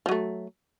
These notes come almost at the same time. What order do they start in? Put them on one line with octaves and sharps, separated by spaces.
F3 F#3 A3